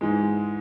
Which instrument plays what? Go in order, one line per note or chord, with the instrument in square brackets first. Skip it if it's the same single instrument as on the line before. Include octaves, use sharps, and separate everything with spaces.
[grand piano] G#2 E3 G#3